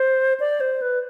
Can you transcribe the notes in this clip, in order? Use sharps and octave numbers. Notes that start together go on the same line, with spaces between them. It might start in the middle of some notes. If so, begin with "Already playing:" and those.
Already playing: C5
D5
C5
B4